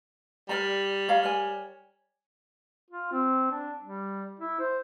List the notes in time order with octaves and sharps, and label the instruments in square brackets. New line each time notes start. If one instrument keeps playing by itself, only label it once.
[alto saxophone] G3 [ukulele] A#4 D5 A#5
[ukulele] C#5 F5 A#5
A#4 C#5 G#5
[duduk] F4
C4
D4
G3
E4
C5